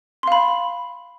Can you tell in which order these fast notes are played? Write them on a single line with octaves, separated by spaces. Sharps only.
C6 F5 B5